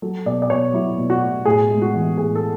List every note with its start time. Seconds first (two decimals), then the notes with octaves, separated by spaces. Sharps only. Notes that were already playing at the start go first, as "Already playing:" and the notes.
0.02 F#3 A4
0.26 B2 D5
0.42 D5
0.50 B2 C#5
0.73 F#3 E4
0.98 B2
1.10 F#4
1.22 A3
1.45 A2 G#4
1.70 G#3
1.82 F#4
1.94 E3
2.18 A2 G#4
2.35 A4